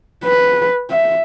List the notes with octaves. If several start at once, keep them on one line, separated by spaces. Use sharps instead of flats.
B4
E5